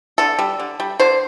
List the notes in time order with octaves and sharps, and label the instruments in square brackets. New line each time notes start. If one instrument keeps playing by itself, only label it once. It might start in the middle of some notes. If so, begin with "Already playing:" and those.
[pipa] D3 A4
G3
D3
G3
D3 C5